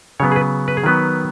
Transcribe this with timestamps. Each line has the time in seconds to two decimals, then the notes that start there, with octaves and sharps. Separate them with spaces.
0.20 C#3 F#3 B3 C#5
0.32 G#4
0.36 B4
0.68 B4
0.77 G#4
0.84 D#3 F#3 B3 B4